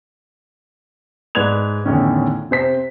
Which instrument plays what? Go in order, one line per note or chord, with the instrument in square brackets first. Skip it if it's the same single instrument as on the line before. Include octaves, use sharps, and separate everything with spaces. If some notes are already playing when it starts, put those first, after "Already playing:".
[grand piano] G#2 B4 D5 G#6 F7
E2 A2 D3 D#3 C#4
C3 C5 B6